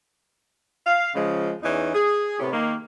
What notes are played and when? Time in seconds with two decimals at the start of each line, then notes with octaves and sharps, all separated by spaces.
0.87 F5
1.15 C#3 F3 G#3
1.63 E2 E3 C#4 D#4
1.94 G#4
2.39 A2 C3 B3 G4 C#5
2.52 D#3 A#3